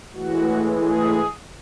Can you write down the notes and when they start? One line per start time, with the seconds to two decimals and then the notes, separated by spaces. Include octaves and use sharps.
0.12 A2 E3 G#3 F#4
0.79 G#4